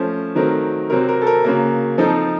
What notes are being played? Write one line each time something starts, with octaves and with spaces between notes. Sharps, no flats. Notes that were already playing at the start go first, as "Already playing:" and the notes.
Already playing: F3 A3 C#4 C5
D#3 F#3 A3 C4 A#4
C3 F#3 C4 A#4
A#4
A4
A#4
C#3 F#3 A#3
F3 C4 D#4 A4